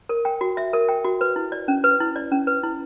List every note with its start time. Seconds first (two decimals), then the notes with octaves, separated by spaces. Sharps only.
0.09 A#4
0.25 G5
0.41 F#4
0.57 E5
0.73 A#4
0.89 G5
1.05 F#4
1.21 B4
1.36 E4
1.52 D5
1.68 C#4
1.84 B4
2.00 E4
2.16 D5
2.32 C#4
2.47 B4
2.63 E4